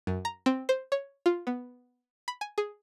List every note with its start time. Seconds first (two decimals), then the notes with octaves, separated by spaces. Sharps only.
0.07 F#2
0.25 A#5
0.46 C4
0.69 C5
0.92 C#5
1.26 F4
1.47 B3
2.28 B5
2.41 G#5
2.58 G#4